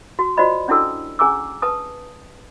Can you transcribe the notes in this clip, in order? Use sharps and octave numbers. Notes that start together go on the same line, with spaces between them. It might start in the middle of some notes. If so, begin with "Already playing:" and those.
F#4
F4 F#4 C5 D5 D#5 B5
C#4 D4 E4 F#4 A4 E6
C#4 G#4 G#5 A#5 D6 E6
B4 A5 D#6